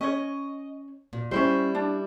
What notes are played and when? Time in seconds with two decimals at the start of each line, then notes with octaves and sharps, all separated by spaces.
0.01 C#4 C#5 D#5
1.13 A#2
1.31 G3 C#4 E4 C5
1.75 D4